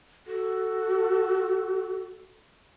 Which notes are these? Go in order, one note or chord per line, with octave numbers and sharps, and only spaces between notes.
F#4 A4